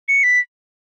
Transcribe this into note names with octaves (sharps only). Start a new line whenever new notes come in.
C#7
B6